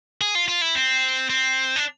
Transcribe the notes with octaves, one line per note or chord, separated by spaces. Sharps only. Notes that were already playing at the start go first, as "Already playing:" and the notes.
G#4
F4
F4
E4
C4
C4
D4